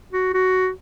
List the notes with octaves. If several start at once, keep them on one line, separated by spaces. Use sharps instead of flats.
F#4
F#4